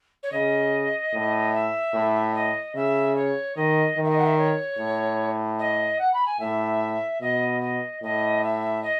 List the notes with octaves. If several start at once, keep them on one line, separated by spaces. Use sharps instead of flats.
C#5
C#3 D#5
A2
E5
A2
D#5
C#3 E5
C#5
D#3 D#5
D#3
E5
D#5
F#5
E5
C#5
A2
D#5
F#5
B5
G#5
A2 E5
B2 D#5
D#5
A2 D#5
E5
D#5